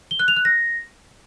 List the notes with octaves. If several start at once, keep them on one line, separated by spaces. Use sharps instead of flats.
G7
F#6
F7
F#6
A#6